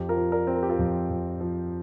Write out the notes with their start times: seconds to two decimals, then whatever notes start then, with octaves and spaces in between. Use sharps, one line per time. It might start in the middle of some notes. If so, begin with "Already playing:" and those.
Already playing: F2 G4
0.09 F4 A#4
0.17 F3
0.32 A#4 D5
0.47 C4
0.55 A#4
0.63 G4
0.69 F4 A#4
0.79 F2
1.10 F2
1.40 F3